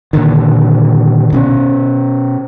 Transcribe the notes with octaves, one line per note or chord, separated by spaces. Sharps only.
A#2 D3 D#3
B2 C4 C#4